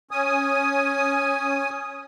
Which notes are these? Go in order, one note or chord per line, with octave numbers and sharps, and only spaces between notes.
C#4 G#5 D#6